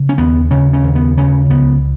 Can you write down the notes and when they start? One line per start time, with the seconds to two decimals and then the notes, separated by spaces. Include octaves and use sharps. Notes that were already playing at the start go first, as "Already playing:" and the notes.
Already playing: C#3
0.09 C#4
0.18 D#2 B3
0.51 C#3 C#4
0.73 C#4
0.83 D#2
0.95 B3
1.17 C#3 C#4
1.50 C#2 B3